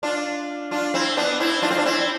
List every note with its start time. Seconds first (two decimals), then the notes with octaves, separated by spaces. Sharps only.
0.03 D4 F4
0.71 D4 F4
0.94 C4 E4
1.17 B3 D4
1.40 C4 E4
1.62 D4 F4
1.71 C4
1.78 D4
1.85 C4 E4